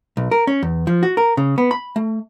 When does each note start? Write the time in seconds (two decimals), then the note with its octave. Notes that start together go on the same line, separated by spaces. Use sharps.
0.17 B1
0.31 A#4
0.47 C#4
0.63 E2
0.87 F3
1.03 F#4
1.17 A#4
1.37 C#3
1.58 B3
1.71 B5
1.96 A3